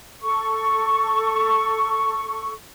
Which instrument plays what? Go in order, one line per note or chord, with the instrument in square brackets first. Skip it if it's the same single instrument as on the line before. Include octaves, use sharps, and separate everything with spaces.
[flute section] A4 C#6